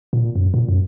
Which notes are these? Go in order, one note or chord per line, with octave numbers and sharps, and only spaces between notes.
A#2
F#2
A#2
F#2